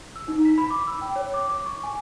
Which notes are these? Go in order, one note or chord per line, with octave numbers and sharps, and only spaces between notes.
E6
D#4
B6
B5
D6
E6
G5
C#5
D6
D6
C#6
G#5